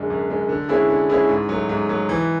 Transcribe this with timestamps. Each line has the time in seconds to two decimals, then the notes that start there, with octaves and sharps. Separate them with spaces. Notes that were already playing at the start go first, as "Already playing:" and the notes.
Already playing: F#2 D3 G#3
0.10 F#2
0.29 D3 G#3
0.49 D3
0.69 G#3 C#4 E4 G#4
0.89 D3
1.09 G#3 C#4 E4 G#4
1.29 G#2
1.49 F#3 A3
1.69 G#2
1.89 F#3 A3
2.09 E3